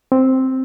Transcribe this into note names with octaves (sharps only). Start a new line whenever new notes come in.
C4